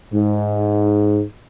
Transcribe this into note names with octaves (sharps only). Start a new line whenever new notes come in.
G#2